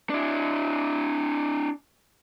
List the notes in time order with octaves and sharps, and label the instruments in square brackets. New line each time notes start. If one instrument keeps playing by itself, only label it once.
[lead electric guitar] D4 E4